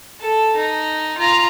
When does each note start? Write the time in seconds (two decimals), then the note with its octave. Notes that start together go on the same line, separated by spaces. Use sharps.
0.20 A4
0.56 D#4
1.18 F4 A#5